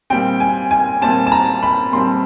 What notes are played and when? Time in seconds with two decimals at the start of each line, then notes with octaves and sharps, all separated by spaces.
0.10 A#2 G3 C4 G5
0.40 G#5
0.71 G#5
1.02 A#2 G3 C4 A5
1.27 A5
1.32 A#5
1.63 B5
1.93 A#2 G3 C4 C6